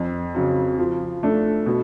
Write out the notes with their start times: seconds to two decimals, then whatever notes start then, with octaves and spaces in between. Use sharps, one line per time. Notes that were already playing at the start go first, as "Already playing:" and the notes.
Already playing: F2
0.35 C#3 F#3
0.79 F3
1.23 A3 D4
1.66 B2